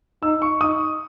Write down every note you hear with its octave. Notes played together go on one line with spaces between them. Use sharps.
D#4 E6
C#6
D#4 D#6